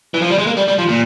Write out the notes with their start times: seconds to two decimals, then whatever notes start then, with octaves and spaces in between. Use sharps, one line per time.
0.14 E3
0.22 F3
0.30 G3
0.38 G#3
0.47 A#3
0.57 G3
0.68 G3
0.78 F3
0.89 A#2